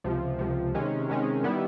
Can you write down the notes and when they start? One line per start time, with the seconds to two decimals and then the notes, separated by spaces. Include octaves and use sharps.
0.04 C#2 C3 F3
0.39 C#2 C3 F3
0.74 C3 D#3 G#3 C#4
1.08 C3 D#3 G#3 C#4
1.43 D#3 G3 B3 E4